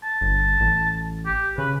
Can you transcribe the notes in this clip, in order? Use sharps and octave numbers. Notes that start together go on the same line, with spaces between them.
A5
G1
A1
G4
C#3 B4